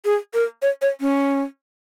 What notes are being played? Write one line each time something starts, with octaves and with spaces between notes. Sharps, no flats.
G#4
A#4
C#5
C#5
C#4